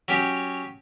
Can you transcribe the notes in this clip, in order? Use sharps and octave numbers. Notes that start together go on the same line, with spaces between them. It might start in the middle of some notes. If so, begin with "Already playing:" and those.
F#3 C#4 G4